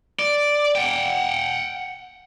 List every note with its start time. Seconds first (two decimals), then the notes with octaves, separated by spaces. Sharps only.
0.19 D5
0.75 F#5 G5